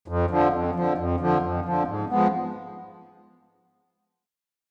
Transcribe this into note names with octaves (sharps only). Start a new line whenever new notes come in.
F2
D3 F3
F2
D3 F3
F2
D3 F3
F2
D3 F3
G#2
F3 G#3 B3